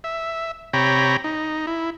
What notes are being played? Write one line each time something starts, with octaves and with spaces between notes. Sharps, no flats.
E5
C3 C#5 G5 A#5 B5
D#4
E4